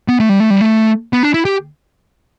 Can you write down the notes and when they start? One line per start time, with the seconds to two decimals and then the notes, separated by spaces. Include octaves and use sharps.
0.08 B3
0.20 A3
0.29 G3
0.40 A3
0.50 G3
0.61 A3
1.13 B3
1.23 D4
1.34 E4
1.45 G4